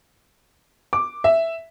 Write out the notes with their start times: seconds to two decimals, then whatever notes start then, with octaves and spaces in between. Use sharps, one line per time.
0.93 D6
1.24 E5